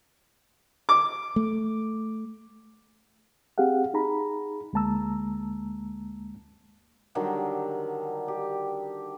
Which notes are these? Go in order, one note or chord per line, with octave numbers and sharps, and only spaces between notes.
D6
A3
C4 G4 G#4 F5 F#5
D#4 G#4 A#5 B5
D2 G#3 A#3 A5 A#5 E6
D3 D#3 F#3 G3
G4